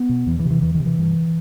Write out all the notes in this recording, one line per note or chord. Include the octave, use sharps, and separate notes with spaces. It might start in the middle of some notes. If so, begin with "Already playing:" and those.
Already playing: B3
B2
E2 E3
E3
C3
E3
E2 E3
D#3
C3
E3
G2